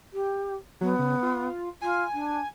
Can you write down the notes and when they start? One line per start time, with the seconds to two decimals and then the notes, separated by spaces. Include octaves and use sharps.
0.12 G4
0.81 F#3 B3
0.99 C#3
1.23 F4
1.81 F4 G#5
2.13 D4